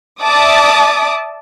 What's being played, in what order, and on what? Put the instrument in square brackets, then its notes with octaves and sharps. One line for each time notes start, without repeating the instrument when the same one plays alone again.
[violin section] D5 E5 A5 D6 D#6